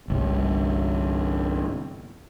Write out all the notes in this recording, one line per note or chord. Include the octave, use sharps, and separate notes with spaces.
G1 C2